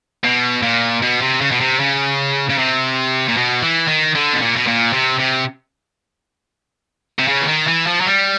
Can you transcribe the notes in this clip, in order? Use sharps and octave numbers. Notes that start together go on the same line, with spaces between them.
B2
A#2
B2
C3
C#3
B2
C3
C#3
C#3
C3
A#2
B2
E3
D#3
D3
B2
A#2
B2
A#2
C3
C3
C3
C#3
E3
D#3
E3
F3
F#3
G3